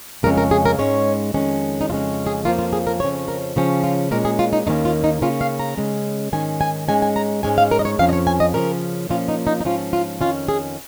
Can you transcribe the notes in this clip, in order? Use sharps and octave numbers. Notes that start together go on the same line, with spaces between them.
F2 C#3 G#3 C#4 A#4
A#4
G#4
A#4
G#2 G#3 C#4 C#5
F2 D#3 G#3 C#4
D#4
F2 C#3 G#3 C#4 F4
G#4
F2 F3 A#3 C#4 F4
F4
G#4
A#4
F2 C#3 F3 C#4 C#5
A#4
C#3 F3 C#4
F4
A#2 G#3 C#4 A#4
G#4
F4
D#4
D#2 D#3 A#3 C#4 D#4
F4
D#4
C#3 A#3 C#4 F4
F5
A#5
C#3 G#3 C#4
G#2 D#3 C#4 G#5
G#5
G#2 G#3 C#4 G#5
G#5
A#5
G#2 G#3 C#4 G#5
F5
A#4
D#5
C#5
F2 F3 C#4 F5
D#5
C#5
G#5
D#5
C#3 F3 C#4 A#4
A#2 F3 A#3 C#4 F4
D#4
D#4
D#4
G#2 F3 C#4 F4
F4
F2 D#3 C#4 F4
G#4